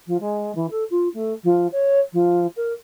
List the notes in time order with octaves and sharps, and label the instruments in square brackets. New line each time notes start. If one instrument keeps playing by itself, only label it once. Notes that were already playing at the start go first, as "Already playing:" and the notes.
[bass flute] F3
G#3
E3
A4
F4
A3
F3
C#5
F3
A#4